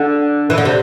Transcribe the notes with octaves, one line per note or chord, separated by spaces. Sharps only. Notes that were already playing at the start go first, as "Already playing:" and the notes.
Already playing: D3
E3
D3
C3